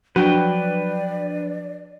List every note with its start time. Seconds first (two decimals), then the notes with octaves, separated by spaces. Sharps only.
0.16 F3 F#3 D4 F#4 B4 D5 G5